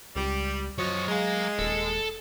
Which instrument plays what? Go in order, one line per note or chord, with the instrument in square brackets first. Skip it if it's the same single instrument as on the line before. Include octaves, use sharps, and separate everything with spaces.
[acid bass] C#2 [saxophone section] G3
[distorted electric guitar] F#2 D#5 [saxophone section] F3 F#4 C#5 [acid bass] F#3
[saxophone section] G#3 [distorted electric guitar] A#4 F5
[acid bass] D#1 [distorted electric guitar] A4